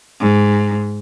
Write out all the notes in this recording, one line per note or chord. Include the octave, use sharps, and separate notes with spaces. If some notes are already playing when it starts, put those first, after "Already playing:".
G#2